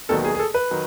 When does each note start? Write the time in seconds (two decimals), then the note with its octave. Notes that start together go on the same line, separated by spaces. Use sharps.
0.09 E1 D#2 D#3 F#3 B3 A4
0.25 G#4
0.35 G#4
0.40 A4
0.54 B4
0.71 D#3 F#3